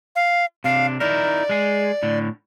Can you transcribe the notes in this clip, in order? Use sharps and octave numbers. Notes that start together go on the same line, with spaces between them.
F5
C3 D4 F5
D#4 E4 A#4 D5
G#3 G#4
A2 D3